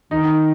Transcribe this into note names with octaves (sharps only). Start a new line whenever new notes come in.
D#3 D#4